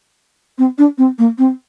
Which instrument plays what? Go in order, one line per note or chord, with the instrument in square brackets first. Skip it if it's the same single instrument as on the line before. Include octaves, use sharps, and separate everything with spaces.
[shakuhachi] C4
D4
C4
A#3
C4